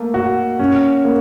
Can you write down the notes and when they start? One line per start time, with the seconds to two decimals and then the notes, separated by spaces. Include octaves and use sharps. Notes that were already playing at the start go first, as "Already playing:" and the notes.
Already playing: A3 A#3
0.14 F#4
0.59 C#4
1.05 A#3